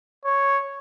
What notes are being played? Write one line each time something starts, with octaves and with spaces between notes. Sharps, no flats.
C#5